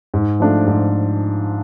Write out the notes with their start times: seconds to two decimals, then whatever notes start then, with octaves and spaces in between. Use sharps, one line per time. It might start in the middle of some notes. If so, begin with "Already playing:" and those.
0.14 G#2
0.40 F3 A3 D4 F4
0.67 G#2